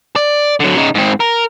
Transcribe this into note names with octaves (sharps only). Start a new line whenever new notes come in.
D5
D3 F#3
C#3 D#4
G#2 C4
A#4